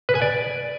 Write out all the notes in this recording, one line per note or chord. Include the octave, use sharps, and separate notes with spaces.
B4
G#5
D5